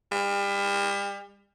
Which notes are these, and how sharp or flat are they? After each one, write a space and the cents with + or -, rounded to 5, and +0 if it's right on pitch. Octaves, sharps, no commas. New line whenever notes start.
G3 +35